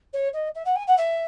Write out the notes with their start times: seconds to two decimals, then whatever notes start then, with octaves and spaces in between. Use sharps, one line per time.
0.13 C#5
0.33 D#5
0.54 E5
0.65 F#5
0.75 G#5
0.87 F#5
0.97 E5